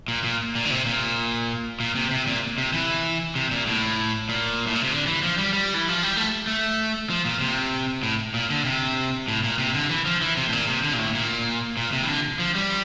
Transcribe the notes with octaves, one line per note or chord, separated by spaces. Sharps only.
A#2
A#2
A#2
D3
C3
A#2
A#2
C3
C3
A#2
C3
E3
C3
A#2
A2
A#2
A2
A#2
C3
D3
E3
F3
G3
G3
E3
F3
G3
A3
A3
F3
A#2
C3
A2
A#2
D3
C3
A2
A#2
C3
D3
E3
F3
E3
C3
A2
A#2
C3
D3
A#2
A2
A#2
A#2
C3
E3
D3
F3
G3